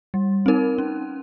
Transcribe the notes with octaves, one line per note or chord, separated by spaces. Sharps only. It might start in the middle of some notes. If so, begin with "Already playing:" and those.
G3
C4 D#4 A#4
C#4